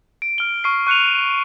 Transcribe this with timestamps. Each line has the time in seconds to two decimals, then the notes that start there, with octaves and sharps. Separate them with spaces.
0.22 D7
0.38 F6 G7
0.64 C#6 F6 C7
0.87 C#6 F#6 C#7 D#7 F7